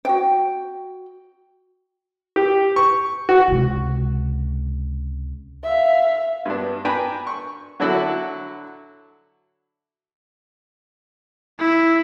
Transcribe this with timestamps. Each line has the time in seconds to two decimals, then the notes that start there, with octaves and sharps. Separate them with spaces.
0.05 F#4 G5
2.36 G4
2.76 C#6
3.29 F#4
3.48 C#2 C3
5.63 E5 F5
6.46 G2 B3 D4
6.85 D4 B4 G5 G#5 A#5 B5
7.27 C#6
7.80 D3 F#3 D4 E4 F#4 A4
11.59 E4